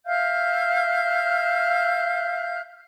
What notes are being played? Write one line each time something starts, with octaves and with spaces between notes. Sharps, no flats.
E5 F5 F6 G6